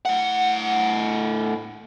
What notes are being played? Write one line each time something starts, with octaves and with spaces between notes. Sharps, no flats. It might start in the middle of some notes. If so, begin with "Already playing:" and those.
A2 F#5